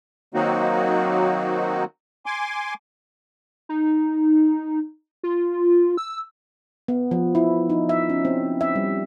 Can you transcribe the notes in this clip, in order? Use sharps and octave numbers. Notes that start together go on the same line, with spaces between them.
D#3 F#3 A#3 C4 D#4 F#4
G#5 C6 D6
D#4
F4
E6
B3
F3
E4
D#4
E5
C#4
C4
E5
G3